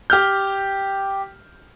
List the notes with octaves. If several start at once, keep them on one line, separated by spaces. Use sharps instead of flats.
G4 F6 G6